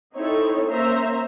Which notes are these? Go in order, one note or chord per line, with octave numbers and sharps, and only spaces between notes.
C4 D#4 E4 A4 C#5
A#3 C#4 C5 E5 A#5